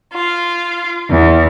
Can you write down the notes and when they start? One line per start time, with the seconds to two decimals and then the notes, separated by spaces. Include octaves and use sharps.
0.12 F4
1.12 E2